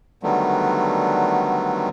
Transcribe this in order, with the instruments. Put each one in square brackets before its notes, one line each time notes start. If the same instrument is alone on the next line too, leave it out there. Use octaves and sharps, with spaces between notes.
[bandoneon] D3 D#3 F#3 G3 A3 B3